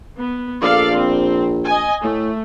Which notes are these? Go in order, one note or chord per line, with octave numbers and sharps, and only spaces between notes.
B3
A#1 A4 D5 F5
C4
D#5 G#5
A2 A3